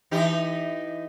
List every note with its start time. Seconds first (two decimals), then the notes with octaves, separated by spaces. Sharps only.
0.11 E3 D#4 G4